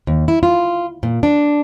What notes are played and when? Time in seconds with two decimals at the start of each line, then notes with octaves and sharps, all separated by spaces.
0.07 D#2
0.28 E4
0.43 F4
1.03 A#2
1.23 D4